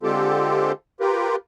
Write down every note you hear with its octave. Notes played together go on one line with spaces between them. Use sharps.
D3 G#3 C4 F4 G4 A4
F4 G4 A#4 B4